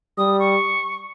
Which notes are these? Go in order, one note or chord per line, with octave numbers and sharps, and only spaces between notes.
G3 D#6
C#6